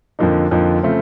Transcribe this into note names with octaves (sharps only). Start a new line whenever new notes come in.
F2 D3 F3 A#3 D#4
F2 D3 F3 A#3 D#4
C#3 F3 A3 C4